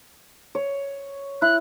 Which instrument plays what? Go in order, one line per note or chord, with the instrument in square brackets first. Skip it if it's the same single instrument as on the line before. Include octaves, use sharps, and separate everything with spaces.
[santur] C#5
[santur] E4 [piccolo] F#6